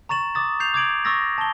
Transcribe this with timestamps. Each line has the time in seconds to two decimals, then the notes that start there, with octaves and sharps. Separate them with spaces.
0.09 A#5 C#6 A6 E7 F#7
0.35 D6 D#6 A6
0.60 G6 C7 F7
0.74 D6 G#6 D7 F#7
1.05 C#6 D#6 E6 A6 A#6
1.38 A5 G7